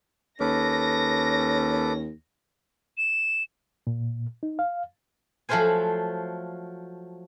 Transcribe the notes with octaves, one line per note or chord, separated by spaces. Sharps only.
D#2 C#4 A4 B4 D6 A#6
E7
A#2
D#4
F5
F3 F#3 A3 F4 C5 G#5